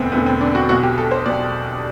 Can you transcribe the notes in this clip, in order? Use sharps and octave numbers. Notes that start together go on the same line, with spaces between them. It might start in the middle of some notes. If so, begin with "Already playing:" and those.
Already playing: E1 D2 D3 B3 C4
E1 D2 D3 B3
C4
D4
F#4
B1 B2 F#4
G4
A4
C5
B1 B2 D5